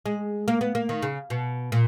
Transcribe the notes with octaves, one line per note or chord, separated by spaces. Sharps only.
G#3
A#3
B3
A#3
D#3
C#3
B2
A#2